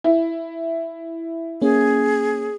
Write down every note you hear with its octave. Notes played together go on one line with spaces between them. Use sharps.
E4
A#3 C#4 G#4